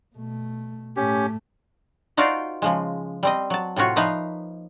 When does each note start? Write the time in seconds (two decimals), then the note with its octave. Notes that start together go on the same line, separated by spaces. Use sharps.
0.14 B2 A3
0.97 A2 A3 C#4 G4
2.17 D#4 F4 F#4 C5 D5 F5
2.62 C#3 F3 G#3
3.23 G3 C4 D#5
3.50 F#3 A5
3.76 A2 C3 F4 F#4 C#5
3.96 F3 A#3 D#4 B4 E5 F5